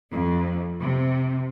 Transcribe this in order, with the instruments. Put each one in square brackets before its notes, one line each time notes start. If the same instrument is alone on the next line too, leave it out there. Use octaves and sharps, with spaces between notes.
[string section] F2
C3